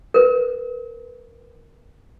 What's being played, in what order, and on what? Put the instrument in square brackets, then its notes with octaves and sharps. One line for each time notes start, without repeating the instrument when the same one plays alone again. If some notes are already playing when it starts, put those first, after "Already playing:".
[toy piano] A#4 B4